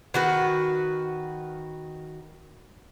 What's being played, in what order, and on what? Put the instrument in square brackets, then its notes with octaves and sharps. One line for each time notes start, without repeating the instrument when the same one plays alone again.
[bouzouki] D#3 F#4 B4